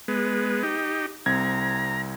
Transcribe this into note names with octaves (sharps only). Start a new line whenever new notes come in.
G#3 B3
D#4 G4
C2 C4 A#5 G#6